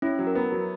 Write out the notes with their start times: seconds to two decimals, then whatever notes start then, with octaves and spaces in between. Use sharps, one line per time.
0.02 C#4 E4
0.19 F#3
0.27 A#4
0.35 B3
0.52 F#3